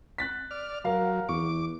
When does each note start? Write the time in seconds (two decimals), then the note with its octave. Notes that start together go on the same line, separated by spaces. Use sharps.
0.18 F#6 A6 B6
0.51 D5 F6
0.84 F#3 A#4 F5 A#5
1.29 E2 C#6 D6